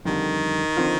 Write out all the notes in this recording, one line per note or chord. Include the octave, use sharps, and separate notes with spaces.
F2 D3 D#3 G3
D3 F3 C4 F4